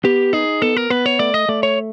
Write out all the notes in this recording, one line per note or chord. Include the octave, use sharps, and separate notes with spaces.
B3 G4
D#4 G#4
B3 A4
A#4
B3 B4
C#5
A3 D5
D#5
A3 D5
C#5